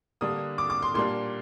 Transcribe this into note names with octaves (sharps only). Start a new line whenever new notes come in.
D3 G3 A#3 D4 D#6
D6
D6
C6
A#2 G3 A#3 D4 C6